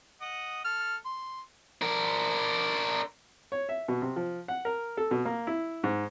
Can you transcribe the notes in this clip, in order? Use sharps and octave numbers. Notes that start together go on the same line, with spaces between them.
D#5 F#5 D#6
A4 F6
C6
D4 A#4
C#5
E5
B2
C3
F3
F#5
A#4
A4
B2
A#3
E4
G#2